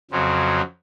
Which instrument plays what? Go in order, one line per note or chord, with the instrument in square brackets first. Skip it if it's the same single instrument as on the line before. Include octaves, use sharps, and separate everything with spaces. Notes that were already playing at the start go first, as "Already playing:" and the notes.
[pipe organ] F2 C#3 F#3 C4